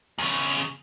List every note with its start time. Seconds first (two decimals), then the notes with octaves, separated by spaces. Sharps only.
0.18 E2 C#3